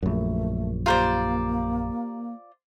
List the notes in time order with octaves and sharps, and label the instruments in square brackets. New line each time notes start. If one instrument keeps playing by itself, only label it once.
[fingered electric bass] A#1 F#2 [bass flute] A3
[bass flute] A#3 [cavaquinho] F4 C5 D5 [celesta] G4 A#5